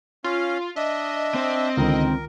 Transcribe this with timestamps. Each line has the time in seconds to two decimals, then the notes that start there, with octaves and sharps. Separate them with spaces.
0.24 C#4 F4 F5
0.76 D4 D#5 E5
1.34 C4 C5
1.77 C#2 D3 D#3 A#4